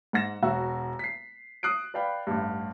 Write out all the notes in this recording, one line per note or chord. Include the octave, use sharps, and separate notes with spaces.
G#2 F#5 A#6 E7
E1 F#4 E6
B6 C7
D#6 F#6 C7 D7
B4 D5 F5 G5 B5
A1 G2